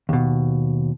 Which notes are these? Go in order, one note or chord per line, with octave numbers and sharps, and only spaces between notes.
D#2 B2